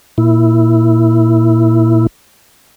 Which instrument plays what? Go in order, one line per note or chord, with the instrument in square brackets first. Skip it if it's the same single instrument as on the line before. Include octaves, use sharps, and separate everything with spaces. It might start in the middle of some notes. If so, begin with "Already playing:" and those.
[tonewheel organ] A#2 E4